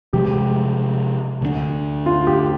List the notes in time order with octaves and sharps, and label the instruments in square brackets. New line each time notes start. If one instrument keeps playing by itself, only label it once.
[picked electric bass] C3 F3 G#3 [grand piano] G4
[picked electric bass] D2 D3 G3 D4
[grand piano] F4
G4